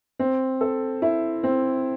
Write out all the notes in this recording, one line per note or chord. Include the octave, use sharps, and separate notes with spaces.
C4
A4
E4
C4